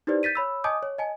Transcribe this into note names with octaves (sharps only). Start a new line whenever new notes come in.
D#4 E4 G4 B4 C5 D5
G6 A6 B6 D#7
C#5 B5 E6
D#5 G#5 A5 D6 D#6 G6
C#5
D#5 G#5 A5